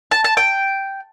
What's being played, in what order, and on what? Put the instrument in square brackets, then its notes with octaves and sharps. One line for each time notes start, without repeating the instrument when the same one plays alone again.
[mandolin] A5
A5
G5